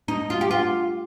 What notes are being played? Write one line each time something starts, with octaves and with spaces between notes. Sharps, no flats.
D#4
F4
G4
F4